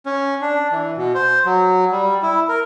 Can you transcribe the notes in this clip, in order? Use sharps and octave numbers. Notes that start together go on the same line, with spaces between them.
C#4
D4
E3
B2
C5
F#3
G3
E4
A#4